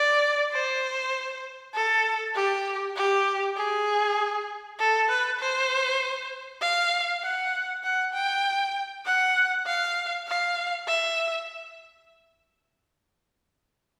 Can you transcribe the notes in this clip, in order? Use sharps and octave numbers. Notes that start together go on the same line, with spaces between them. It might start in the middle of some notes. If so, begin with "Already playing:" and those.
Already playing: D5
C5
A4
G4
G4
G#4
A4
B4
C5
F5
F#5
F#5
G5
F#5
F5
F5
E5